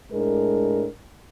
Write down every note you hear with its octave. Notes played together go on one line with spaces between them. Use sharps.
A2 G#3 D4 A#4